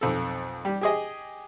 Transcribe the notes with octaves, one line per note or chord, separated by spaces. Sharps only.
B1 F2 A4
G3
G4 G#4 D#5